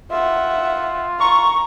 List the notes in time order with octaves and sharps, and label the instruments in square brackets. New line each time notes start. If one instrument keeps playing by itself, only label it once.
[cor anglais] F4 [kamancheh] E5 F#5
[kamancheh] A#5 [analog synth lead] C#6